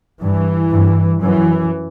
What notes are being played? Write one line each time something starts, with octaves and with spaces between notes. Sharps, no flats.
G2 E3
G2
F#2 E3